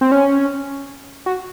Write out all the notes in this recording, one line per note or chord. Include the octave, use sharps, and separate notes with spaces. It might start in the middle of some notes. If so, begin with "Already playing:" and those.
C4
C#4
F#4